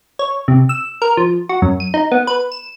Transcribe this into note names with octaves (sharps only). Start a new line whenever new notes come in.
C#5
C3
E6
A#4
F3
F#4
F#2
D#7
D#4
B3
B4
E7